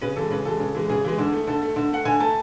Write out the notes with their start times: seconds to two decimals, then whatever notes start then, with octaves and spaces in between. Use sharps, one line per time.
0.02 C#3 B4
0.16 E3 G#3 A4
0.30 C#3 B4
0.45 E3 G#3 A4
0.60 C#3
0.75 E3 G#3
0.89 C#3 G#4
1.04 E3 G#3
1.18 D3
1.33 A3
1.47 D3 A4
1.62 A3
1.76 D3
1.92 A3 F#5
2.05 D3 G#5
2.20 A3 A5